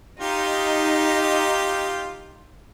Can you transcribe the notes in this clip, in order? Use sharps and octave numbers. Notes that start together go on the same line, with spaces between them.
D#4 F4 G4